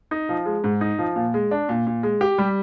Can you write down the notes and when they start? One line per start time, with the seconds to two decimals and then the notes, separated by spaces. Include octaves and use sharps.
0.11 D#4
0.29 F3
0.46 G#3
0.64 G#2
0.81 D#4
0.99 F3
1.16 A#2
1.34 G#3
1.51 D4
1.69 A#2
1.87 A#2
2.03 G#3
2.21 G4
2.38 G3